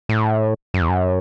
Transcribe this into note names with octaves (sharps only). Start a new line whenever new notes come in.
A2
F#2
E2
F#2